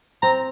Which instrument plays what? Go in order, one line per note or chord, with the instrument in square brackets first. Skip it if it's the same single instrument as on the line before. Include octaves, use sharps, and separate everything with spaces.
[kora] C4 [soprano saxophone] A#5